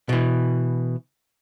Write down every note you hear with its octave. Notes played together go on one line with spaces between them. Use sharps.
B2 E3